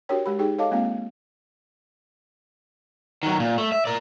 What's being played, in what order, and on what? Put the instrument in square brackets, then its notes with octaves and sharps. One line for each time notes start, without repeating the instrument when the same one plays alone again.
[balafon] D4 F#4 G4 A#4 C#5 G5
G#3 G4 B5
D#4 G4 G#4 G5
A4 C#5 D#5 F5 A5 D6
G#3 A#3 C4 F4 F5
[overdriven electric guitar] D#3 F#3
A#2
A3
E5
A#4 D5